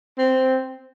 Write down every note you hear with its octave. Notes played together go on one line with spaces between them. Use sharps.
C4